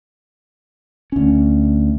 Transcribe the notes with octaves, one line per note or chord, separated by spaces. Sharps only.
D2 C#4